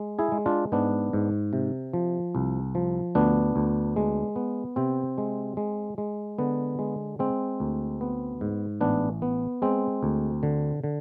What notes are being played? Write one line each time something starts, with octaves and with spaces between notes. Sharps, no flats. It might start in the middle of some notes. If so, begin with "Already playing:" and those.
Already playing: G#3
E4 G#4
G#3
D4 F4
G#2 B3 D4
G#2
C3
F3
C2
F3
D2 B3 D4
D2
G#3
B3
C3 C4
G#3
G#3
G#3
D3 B3
G#3
G#3 C4
D2
B3
G#2
A1 B3 D4
B3
G#3 C4
D2
D3
D3